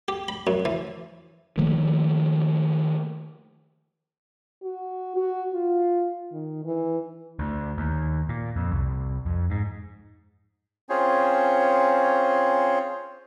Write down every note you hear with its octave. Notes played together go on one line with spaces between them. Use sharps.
G4
B5
F#2
E3
D#3 F3 A3 A#3
F#4
F#4
F4
D#3
E3
D2
D#2
A#2
F2
C2
F2
G#2
C4 C#4 F4 G#4 C5 C#5